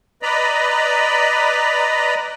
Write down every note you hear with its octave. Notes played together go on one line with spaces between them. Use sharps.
B4 D5 D#5 A#5 B5